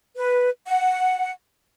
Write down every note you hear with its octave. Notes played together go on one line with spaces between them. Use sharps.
B4
F#5